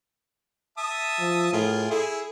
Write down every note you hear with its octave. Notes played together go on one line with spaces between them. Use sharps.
E5 A5 D#6
F3
A2 F4 G#4 A#4
E4 G#4 A4